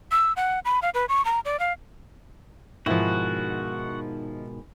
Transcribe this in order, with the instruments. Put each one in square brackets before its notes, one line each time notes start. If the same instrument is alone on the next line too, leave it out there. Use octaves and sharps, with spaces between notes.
[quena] E6
F#5
B5
F5
B4
C#6
A#5
D5
F5
[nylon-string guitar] G#2 B2 D#3 [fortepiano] F3 E4 [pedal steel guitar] F#4 F#5